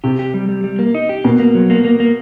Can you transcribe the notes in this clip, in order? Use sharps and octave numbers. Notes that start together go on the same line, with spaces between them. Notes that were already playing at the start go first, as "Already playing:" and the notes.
C3 G4
G4
G3
G3
G3
A#3
D#4
G4
B2 A#3
A#3
F#3
A#3
A#3
A#3